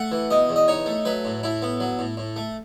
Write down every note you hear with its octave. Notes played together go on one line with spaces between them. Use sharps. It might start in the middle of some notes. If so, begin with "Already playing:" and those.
Already playing: A3 F#5
E3
B2 D#5
E2
D#5
D#4 C#5
A3
F#3 B4
A2
A2 E4
B3
F#3
A2
A2
A3